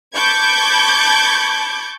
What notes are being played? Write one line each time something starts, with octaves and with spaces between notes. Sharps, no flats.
A5 B5 C#6 D6 G6 G#6